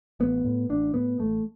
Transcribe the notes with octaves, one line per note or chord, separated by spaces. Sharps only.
A1 B3
A2
A1 D4
A2 B3
A1 A3